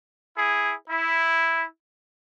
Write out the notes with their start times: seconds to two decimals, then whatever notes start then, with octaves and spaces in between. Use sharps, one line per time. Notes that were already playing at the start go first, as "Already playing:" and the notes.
0.36 E4 G#4
0.89 E4